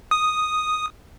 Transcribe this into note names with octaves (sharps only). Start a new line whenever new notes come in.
D#6